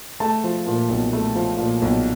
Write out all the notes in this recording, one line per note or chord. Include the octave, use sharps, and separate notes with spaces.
A3 A5
F3
A#2
B1
A3
F3
A#2
B1